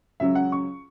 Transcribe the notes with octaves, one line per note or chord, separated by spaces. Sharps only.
C#2 C#3 F#3 E5
F#5
C#6